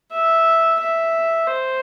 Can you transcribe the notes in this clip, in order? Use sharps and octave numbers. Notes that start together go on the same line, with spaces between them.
E5
E5
C5